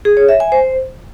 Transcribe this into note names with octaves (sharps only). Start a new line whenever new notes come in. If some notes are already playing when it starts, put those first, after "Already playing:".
G#4
C#5
E5
G#5
C5